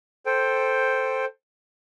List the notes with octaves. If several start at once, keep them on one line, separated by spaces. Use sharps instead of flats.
A4 C5 G5